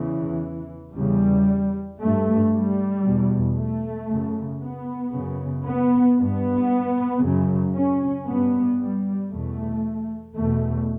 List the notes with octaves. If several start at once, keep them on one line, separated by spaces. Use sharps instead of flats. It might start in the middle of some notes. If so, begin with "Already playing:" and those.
Already playing: E2 C#3 E3
E2 C#3 G3
G2 A3
G3
E2 B2
A3
F#2 C#3
B3
F#2 C#3
B3
G2 B3
F#2 C#3
C#4
G2 B3
G3
E2 B2 A3
E2 B2 A3